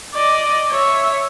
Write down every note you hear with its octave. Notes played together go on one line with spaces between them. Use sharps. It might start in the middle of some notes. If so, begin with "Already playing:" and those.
D5 D#5
C#5 E5